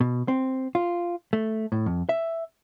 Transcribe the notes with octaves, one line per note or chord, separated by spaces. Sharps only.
B2
C4
F4
A3
A2
F2
E5